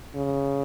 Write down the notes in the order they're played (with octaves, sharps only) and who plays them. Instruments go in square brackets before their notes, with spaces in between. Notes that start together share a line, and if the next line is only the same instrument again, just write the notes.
[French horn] C#3